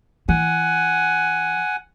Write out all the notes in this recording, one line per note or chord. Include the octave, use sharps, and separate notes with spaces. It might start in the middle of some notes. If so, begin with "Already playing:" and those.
E3 F#5 G#5